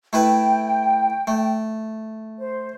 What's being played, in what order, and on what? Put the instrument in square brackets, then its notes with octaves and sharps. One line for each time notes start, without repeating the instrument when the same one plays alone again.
[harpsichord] A3 E4 B4 [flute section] G5
[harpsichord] A3
[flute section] C5